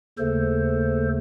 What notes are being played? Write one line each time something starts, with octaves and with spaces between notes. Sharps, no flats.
D#2 C#3 A3 A4 C5